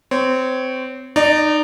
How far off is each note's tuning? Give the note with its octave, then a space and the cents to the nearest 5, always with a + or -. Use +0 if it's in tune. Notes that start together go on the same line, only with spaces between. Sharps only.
C4 -20 C#5 +0
D#4 -25 D5 +0